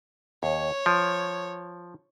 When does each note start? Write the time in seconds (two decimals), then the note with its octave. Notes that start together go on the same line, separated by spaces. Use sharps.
0.43 D#2 C#5
0.86 F3